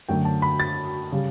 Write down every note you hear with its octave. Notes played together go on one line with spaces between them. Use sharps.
F#2 D3 F#3 A3 G5
A5
B5
A6
C#3 G3